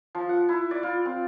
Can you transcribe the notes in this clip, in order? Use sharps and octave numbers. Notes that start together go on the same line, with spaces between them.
F3
F#5
E4
D5
F4
C4